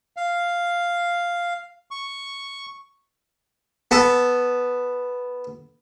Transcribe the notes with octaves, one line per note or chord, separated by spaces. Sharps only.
F5
C#6
B3 A4